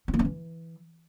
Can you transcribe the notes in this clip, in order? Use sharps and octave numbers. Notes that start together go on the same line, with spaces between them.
C#4
A#3
C#4
E3